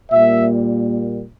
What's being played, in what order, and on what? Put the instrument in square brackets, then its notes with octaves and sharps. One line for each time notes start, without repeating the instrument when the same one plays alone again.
[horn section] A#2 G3 A#3 E5